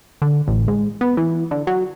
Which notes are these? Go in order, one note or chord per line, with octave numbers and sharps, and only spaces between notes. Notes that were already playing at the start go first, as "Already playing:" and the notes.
D3
A1
G#2
B3
E3
D3
F#3